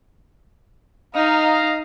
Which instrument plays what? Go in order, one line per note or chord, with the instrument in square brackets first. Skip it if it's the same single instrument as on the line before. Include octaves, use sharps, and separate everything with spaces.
[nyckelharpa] D#4 [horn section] D#5 F5 A#5